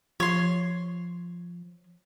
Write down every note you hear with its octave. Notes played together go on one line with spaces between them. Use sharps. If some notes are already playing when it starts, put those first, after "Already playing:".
F3 C#5 C6